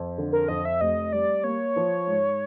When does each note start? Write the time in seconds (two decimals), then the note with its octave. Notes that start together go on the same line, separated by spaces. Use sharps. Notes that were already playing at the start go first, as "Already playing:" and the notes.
Already playing: F2
0.18 D3
0.33 A#4
0.48 F2 D#5
0.65 E5
0.80 F1 D#5
1.13 G3 D5
1.44 A#3 C#5
1.76 F3
2.07 G#2